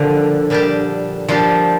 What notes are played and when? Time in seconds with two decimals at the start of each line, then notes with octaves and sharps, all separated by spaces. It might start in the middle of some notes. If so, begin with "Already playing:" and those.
Already playing: A#2 D3 F3 G3 D4 G4
0.50 A#2 G3 D4 G4
1.28 A#2 F3 G3 D4 G4